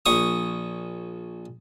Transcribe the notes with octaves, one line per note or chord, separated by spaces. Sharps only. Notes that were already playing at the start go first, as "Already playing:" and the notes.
A#1 C#6 D#6